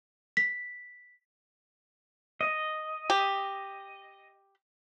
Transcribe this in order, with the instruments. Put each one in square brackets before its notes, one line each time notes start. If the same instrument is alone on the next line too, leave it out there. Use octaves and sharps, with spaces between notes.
[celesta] B6
[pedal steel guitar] D#5
[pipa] G4